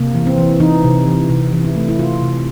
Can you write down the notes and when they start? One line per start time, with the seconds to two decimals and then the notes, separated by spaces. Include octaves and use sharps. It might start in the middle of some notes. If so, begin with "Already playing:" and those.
Already playing: C3 A#3
0.15 E3
0.27 C4
0.38 E3
0.60 E3 D#4
0.84 C3
1.07 E3
1.29 C3
1.53 E3
1.65 E4
1.76 A3
1.88 E4
1.99 C3 F4
2.22 C3